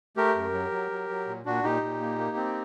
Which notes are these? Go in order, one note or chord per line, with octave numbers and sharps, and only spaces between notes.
A3 G4 A#4
F#2
F#3
F#3
F#3
F#3
A#2
A#2 D4 F#4
A#2 D#4 G4
A#2
A#3
A#3
C4